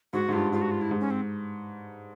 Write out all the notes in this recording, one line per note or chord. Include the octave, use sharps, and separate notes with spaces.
G#2 F#4
G#2
G2 F4
G#2 F4
F#4
F4
E4
G#2
C#4
C4